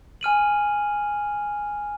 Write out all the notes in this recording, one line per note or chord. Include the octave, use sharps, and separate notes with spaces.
G#5 F6 D#7 F#7